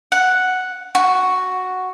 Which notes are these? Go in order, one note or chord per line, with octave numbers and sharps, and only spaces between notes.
F#5
F#4